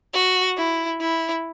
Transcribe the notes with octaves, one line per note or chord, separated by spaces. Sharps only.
F#4
E4
E4